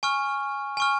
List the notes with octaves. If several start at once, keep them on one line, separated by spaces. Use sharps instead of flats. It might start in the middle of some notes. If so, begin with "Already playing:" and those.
G#5 C#6 F6
G#5 C#6 F6